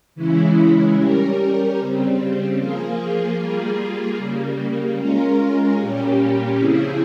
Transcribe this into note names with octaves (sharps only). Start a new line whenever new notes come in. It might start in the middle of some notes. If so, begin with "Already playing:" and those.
C#3 E3 G#3 C#4 E4
G3 C#4 G4 A#4
C#3 G3 C4
F3 A#3 F4 G#4
G3 A#3 F4 G#4
C#3 G3 A#3
G#3 C#4 F4 A#4
A#2 G3 A#3 C#4 G4
C#3 F3 C4 E4 G#4